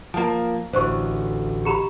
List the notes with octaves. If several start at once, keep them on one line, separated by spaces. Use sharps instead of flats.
F3 A#3 A5 A#5
A1 D2 C5 C#6
G4 A#5 B5